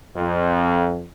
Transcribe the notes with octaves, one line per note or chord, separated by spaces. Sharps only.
F2